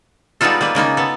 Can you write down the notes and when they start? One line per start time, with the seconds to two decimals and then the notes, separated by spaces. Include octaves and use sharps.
0.41 G3 G#3 B3 D#4 F4 A4
0.61 G3 A#3 F4 B4
0.75 C#3 A#3 D#4 F4
0.97 B3 A4